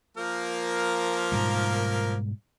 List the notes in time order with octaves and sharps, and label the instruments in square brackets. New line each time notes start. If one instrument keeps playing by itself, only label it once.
[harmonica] F3 A#3 A#4
[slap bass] G#2 B2 G3